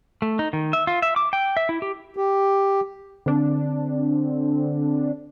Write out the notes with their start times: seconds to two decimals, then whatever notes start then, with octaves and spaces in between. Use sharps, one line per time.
0.22 A3
0.39 D#4
0.53 D#3
0.73 E5
0.87 F4
1.02 E5
1.16 D6
1.33 G5
1.57 E5
1.69 E4
1.82 G4
2.17 G4
3.26 D3 C4 D4